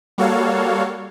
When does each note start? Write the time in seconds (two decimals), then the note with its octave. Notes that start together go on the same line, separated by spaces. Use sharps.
0.18 G3 A#3 F#4 A4 C#5 F5